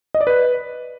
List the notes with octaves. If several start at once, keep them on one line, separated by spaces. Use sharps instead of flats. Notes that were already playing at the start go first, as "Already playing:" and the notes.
D#5
D5
B4